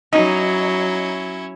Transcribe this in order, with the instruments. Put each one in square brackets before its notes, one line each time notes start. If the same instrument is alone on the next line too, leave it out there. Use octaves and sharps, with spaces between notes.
[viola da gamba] F#3 [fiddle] C#4 E4 [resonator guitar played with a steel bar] D#4 [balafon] D#5